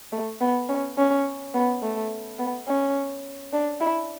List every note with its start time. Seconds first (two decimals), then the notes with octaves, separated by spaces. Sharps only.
0.12 A3
0.41 B3
0.69 C#4
0.98 C#4
1.54 B3
1.82 A3
2.39 B3
2.67 C#4
3.53 D4
3.81 E4